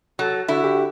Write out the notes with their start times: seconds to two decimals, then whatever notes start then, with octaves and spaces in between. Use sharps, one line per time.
0.19 F#3 A4
0.48 D3 E4 F#4
0.64 G4